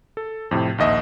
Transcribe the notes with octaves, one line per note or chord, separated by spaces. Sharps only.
A4
F2 A2 C3
A#1 D#2 D#5 E5